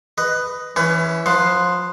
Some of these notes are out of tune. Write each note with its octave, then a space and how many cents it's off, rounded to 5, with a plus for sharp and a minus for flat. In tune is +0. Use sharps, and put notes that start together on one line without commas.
B4 +10 D#5 +0
E3 +0 C#4 +15 B4 +35
F3 +30 B4 +0 C6 +0